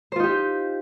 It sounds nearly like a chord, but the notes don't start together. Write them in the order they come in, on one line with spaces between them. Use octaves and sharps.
C5 F4 D#4 G4